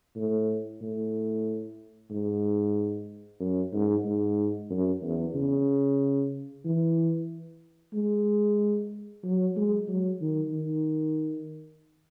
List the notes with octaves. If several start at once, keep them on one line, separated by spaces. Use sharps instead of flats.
A2
A2
G#2
F#2
G#2
G#2
F#2
E2
C#3
E3
G#3
F#3
G#3
F#3
D#3
D#3